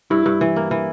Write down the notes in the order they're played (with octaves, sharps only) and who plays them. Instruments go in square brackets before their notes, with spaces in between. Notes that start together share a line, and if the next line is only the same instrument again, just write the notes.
[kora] G2 [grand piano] E4
[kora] G2
E3
A#3
E3